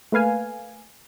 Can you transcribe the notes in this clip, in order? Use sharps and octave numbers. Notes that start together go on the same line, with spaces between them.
A3 A#3 B4 F5 G#5